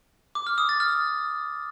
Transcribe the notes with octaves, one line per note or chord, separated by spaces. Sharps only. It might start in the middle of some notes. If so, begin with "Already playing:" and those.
D6
F6
D#6
A6
F6